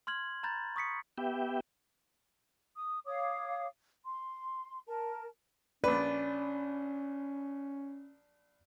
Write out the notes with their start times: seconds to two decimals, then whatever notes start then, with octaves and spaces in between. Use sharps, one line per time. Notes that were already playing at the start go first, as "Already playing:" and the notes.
0.07 C6 F6 G#6 F#7
0.43 A#5 B5 G6 A6
0.76 C#6 D#6 B6 C#7
1.18 B3 G4 E5 G5
2.75 D#6
3.05 C#5 F5 D6 D#6
4.04 C6
4.87 A#4 A5
5.84 A#1 C#4 B4 D5